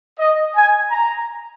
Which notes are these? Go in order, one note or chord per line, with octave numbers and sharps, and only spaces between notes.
D#5
G#5
A#5